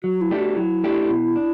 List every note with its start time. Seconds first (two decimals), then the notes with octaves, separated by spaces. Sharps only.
0.03 F#3 F#4
0.21 E4
0.31 A3 D4 G4
0.39 F#4
0.56 F#3 E4
0.84 A3 D4 G4
1.10 B2
1.36 D4